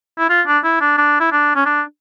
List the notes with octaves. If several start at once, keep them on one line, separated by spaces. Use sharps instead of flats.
E4
F4
D4
E4
D4
D4
E4
D4
C#4
D4